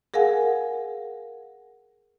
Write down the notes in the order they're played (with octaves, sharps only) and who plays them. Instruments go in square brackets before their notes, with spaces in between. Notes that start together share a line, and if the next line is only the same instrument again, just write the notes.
[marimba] G#4 A#4 F5 F#5 G#5